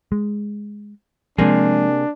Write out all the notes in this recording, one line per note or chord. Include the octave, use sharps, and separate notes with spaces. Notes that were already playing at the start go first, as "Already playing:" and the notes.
G#3
C3 F3 F#3 G#3 A#3 D4 G#4